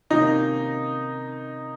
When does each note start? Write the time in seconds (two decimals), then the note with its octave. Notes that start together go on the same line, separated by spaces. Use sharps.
0.10 C3 D#3 A#3 C#4 D#4